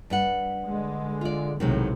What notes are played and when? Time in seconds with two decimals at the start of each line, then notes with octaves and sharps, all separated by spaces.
0.10 G2 E5 F#5
0.63 D3 G#3
1.21 F4 D5
1.60 B1 A2 C3 D#3 F#3 G#3